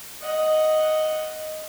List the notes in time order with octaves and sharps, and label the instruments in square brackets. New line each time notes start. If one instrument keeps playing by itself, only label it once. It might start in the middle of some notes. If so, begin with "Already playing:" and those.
[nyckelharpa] D#5 F#5